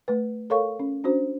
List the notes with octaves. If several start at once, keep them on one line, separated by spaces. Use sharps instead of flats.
A3 B4
A4 A#4 C#5 F5 C#6
C#4
C#4 D4 F#4 C5